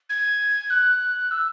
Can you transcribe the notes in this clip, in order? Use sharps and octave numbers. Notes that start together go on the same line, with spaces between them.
G#6
F#6
E6